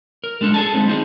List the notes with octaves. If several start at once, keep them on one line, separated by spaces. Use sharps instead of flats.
A#4
G3 G#3 D4 A4
G#4 A4 D#5 G#5 A5
G3 G#3 C4 D#4
C4 D#4 G#4